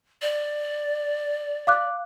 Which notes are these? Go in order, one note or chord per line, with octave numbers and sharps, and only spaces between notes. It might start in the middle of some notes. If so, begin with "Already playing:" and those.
D5
F5 D6 F#6